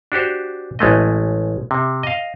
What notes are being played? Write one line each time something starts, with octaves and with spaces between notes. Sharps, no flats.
D4 F#4 G4 C5
A1 G#3 A3 D#5
C3
D#5 F5